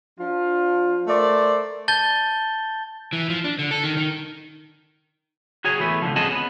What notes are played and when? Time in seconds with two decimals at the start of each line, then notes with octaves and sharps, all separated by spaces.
0.19 F3 D4 F4
1.07 A3 A#4 C5 D5
1.88 A5 G6 A6 G7
3.13 E3
3.30 F3
3.44 D4
3.59 D3
3.71 A4
3.84 D#3
3.97 D#3
5.64 F#4 G#4 C#5 G#5
5.80 E3 A3 B3
6.02 C#2 G2 D3 F3
6.16 C4 C#4 G#4 D#5 F#5 A5
6.32 B3